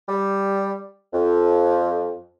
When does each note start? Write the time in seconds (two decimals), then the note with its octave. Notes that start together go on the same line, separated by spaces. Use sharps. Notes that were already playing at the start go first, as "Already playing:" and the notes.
0.09 G3
1.13 F2